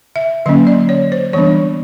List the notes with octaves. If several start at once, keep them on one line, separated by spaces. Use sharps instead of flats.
E5
D3 F#3 A#3 C#4 D#5
D5
C#5
C5
E3 G3 B3 D4 C#5